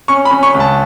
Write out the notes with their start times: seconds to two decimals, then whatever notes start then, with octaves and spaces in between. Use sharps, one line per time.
0.08 C#4 C#6
0.25 B5
0.31 C#4
0.43 C#6
0.54 C#2
0.60 A5